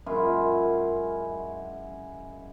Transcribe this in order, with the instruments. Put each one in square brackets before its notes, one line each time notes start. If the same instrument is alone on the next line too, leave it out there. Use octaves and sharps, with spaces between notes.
[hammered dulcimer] F#2 G#3 E4 F4